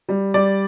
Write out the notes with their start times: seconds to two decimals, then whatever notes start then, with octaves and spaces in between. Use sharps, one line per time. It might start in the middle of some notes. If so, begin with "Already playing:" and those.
0.09 G3
0.34 G3 D5